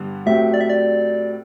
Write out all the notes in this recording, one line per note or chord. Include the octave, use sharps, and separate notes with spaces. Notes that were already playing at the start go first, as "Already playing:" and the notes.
Already playing: G2 D3 G3 B3
A2 F#3 A3 C4 G4 E5
D5
E5
D5